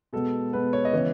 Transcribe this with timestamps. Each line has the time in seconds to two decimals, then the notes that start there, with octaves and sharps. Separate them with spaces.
0.13 B2 G#3 B3 A4
0.53 B2 G#3 B3 B4
0.73 C#5
0.85 D#5
0.93 C#3 E3 B3 C#5